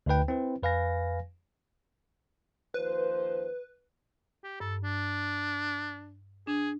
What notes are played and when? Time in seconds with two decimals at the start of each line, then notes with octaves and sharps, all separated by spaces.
0.06 D2 D3 D#4 B4 G5
0.28 C4 E4 B4
0.63 F2 B4 F5 G#5 A#6
2.74 D#2 F3 B4 C5
4.44 G4
4.60 G2 A4
4.84 D4
6.47 D4 G#4